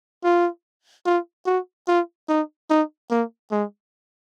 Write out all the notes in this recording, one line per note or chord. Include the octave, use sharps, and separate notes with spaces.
F4
F4
F#4
F4
D#4
D#4
A#3
G#3